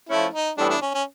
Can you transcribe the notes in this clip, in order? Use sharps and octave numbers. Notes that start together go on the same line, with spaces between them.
F3 A3 C#4 E4
D#4
A2 E3 G3 B3 D4 E4
D4
C#4
C#4